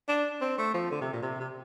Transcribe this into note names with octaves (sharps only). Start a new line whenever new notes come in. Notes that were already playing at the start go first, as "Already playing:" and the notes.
D4
C4
A3
F3
D3
C3
A#2
C3
C3